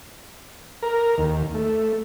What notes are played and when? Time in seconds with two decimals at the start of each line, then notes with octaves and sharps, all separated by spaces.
0.83 A#4
1.18 D#2
1.55 A3